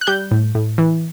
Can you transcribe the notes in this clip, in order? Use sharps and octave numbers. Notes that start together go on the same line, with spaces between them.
F#6
G3 G6
A2
A2
E3